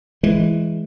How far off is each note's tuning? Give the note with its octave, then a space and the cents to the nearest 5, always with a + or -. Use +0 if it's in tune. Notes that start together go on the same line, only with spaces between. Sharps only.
E3 +0 G#3 +0